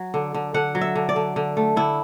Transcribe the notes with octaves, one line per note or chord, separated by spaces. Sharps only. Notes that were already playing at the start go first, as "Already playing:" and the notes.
Already playing: F#3
D3
D3
D3 F#5
F#3
E5
D3
D5
D3
D3
A3
D3 E4